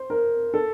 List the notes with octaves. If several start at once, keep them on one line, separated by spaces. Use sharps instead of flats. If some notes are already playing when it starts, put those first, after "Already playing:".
Already playing: C5
A#4
A4